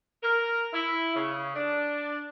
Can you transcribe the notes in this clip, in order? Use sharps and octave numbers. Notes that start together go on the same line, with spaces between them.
A#4
E4
C#3
D4